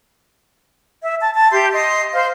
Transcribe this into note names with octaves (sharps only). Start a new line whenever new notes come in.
E5
A5
A5
G4 E5 C6 G6
D#5 C6
C5 F5